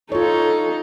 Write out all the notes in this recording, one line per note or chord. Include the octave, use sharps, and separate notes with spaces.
D#4 F4 A4 C#5